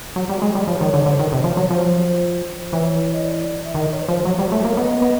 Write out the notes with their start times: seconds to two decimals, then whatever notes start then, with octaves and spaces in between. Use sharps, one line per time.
0.16 F#3
0.29 G3
0.42 G#3
0.55 G3
0.67 F3 C#5
0.81 D#3
0.94 D3
1.06 D3
1.11 C5
1.18 D#3 C#5
1.32 C3
1.44 F3
1.57 F#3 C#5
1.70 F3 C5
2.73 E3 C#5
3.13 D#5
3.24 D5
3.64 E5
3.75 D#3 D#5
3.91 C#5
4.02 B4
4.08 F3 C5
4.25 F#3 C#5
4.39 G3
4.52 A3
4.64 A#3
4.77 B3 D#5
5.02 B3